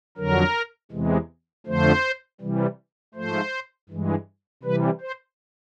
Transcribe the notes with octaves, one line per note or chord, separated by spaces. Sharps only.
F2 D3 F#3 A#4
E2 C3 E3 G#3
F2 D3 F3 A3 C5
C3 E3 G3
G#2 F3 A3 C5
G2 E3 G#3
C3 E3 G3 B4
C5